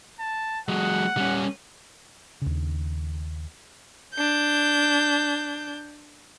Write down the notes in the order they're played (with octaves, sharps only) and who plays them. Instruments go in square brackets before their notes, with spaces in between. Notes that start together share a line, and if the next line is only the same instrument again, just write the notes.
[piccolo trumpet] A5
[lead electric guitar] F#3 G#3 [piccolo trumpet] F#5
[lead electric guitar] G3 C#4
[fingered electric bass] D#2 C#3
[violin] D4 G6